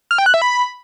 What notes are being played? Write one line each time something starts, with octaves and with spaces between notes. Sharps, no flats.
F6
G5
F#6
E5
B5